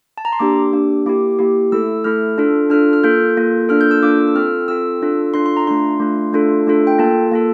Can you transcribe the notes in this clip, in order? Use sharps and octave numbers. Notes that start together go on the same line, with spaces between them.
A5
A#5
C6
A#3 D4 G4 D6
A#3 D4 G4
A#3 E4 G4 D6
A#3 E4 G4
A3 E4 A4 E6
A3 E4 A4 F6
D4 F4 A4
D4 F4 A4 F6
F6
A#3 F4 A4 G6
A#3 F4 A4
A#3 D4 F4 A4 F6
G6
E6
A#3 D4 F4 A4 D6
E6
C4 F4 A4 F6
C4 F4 A4 E6
D4 F4 A4
D4 F4 A4 C6
C6
A#5
A3 D4 F4 C6
A3 D4 F4
A3 D4 F4 A4
A3 D4 F4 A4
G5
A#3 F4 A4 A5
A#3 F4 A4